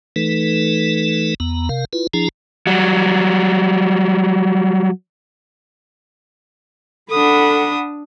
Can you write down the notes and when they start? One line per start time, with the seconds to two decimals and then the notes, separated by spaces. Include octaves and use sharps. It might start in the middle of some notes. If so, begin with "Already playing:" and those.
0.16 E3 A3 D#4 A4 B4
1.40 E2 B3 A#5
1.69 C3 A#4 F5
1.93 E4 F4 B4
2.14 F3 D4 E4 G#4 A#5
2.67 F#3 G3
7.11 D4 A4 F#5 B5 D#6